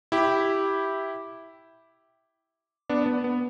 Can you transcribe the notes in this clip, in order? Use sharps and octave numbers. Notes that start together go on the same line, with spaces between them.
E4 G4
B3 D4
B3
B3